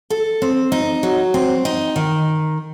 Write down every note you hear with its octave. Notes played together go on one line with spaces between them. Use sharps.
A4
C4
D#4
F#3
C4
D#4
D#3